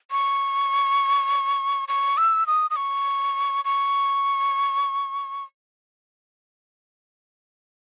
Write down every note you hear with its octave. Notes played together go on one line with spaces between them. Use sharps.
C#6
C#6
E6
D#6
D#6
C#6
C#6